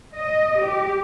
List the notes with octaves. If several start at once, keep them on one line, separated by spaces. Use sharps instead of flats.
D#5
G4